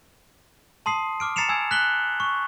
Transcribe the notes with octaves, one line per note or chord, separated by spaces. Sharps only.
A5 C6 D#6 C7
D6 F6 D7
A#5 A6 C7 C#7 E7 F7
G#5 E6 G#6
F#6 B6 F#7 G7
C#6